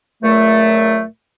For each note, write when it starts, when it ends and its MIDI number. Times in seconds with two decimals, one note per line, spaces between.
0.22 1.02 37
0.22 1.02 46
0.22 1.02 54
0.22 1.02 57